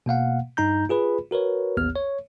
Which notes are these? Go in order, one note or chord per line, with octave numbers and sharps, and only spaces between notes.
B2 A#3 F5 F#5
G2 D#4 A#5 G6
F4 G#4 B4 B5
F#4 A#4 B4 C#5
A1 D#2 B3 F6
C#5